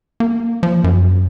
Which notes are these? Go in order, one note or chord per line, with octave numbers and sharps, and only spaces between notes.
A#3
F3
F#2